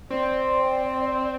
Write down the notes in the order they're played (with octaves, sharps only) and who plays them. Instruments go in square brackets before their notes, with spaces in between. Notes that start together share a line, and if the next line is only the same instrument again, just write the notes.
[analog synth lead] C4 [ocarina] D5